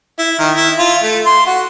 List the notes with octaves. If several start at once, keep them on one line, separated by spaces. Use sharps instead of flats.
E4
D#3
E4
F4
A3
C6
F#4